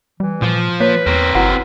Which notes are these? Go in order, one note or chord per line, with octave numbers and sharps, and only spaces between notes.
E3 G3
A#2 F3
A#3 B4 C#5
E2 C4 A#4
G1 E4 F#4 B4 F#5